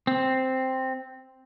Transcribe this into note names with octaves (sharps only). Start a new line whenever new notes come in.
C4